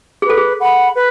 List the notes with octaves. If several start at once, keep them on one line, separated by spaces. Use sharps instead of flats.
G#4 B4
A4
G#4
F#5 B5
B4